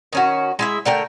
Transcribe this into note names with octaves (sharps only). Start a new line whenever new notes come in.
D#3 C#4 F#4
G#3 E4 E5
D3 A3 A#4 G5